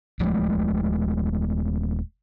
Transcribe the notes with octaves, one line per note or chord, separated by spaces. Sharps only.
D#1 F3 G#3 A3